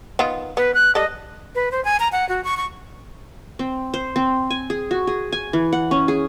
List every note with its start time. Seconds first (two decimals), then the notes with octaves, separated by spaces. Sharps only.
0.19 D#3 B3 F4
0.57 B3 B4
0.75 F#6
0.95 G3 A4 D#5
1.55 B4
1.72 C5
1.85 G#5
2.00 A#5
2.12 F#5
2.29 F#4
2.44 C#6
2.57 C#6
3.59 C4
3.94 C5
4.16 C4
4.51 G#5
4.70 G#4
4.91 F#4
5.07 G#4
5.32 G#5
5.53 E3
5.73 F#5
5.91 C#4
6.08 G#4